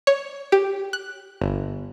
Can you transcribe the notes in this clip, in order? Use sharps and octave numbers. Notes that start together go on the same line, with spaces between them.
C#5
G4
F#6
G1